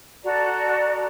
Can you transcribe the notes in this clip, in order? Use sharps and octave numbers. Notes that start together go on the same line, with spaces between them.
F#4 A4 D5 A#5